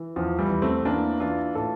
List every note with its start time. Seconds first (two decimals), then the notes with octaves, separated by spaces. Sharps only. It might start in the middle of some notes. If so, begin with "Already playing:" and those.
Already playing: E3
0.16 E2 F3
0.39 E3 G3
0.50 E2
0.62 A3 C4
0.85 E3 A#3 D4
1.20 E3 D4 F4
1.55 A2 F4 A4